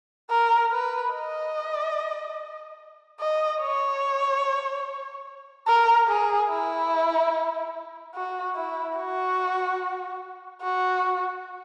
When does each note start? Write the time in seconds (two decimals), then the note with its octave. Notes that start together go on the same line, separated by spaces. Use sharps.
0.30 A#4
0.72 B4
1.13 D#5
3.20 D#5
3.61 C#5
5.67 A#4
6.08 G#4
6.49 E4
8.14 F#4
8.55 E4
8.97 F#4
10.62 F#4